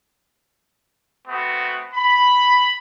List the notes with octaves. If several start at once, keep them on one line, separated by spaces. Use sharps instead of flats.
A3 B3 C4 F#4
B5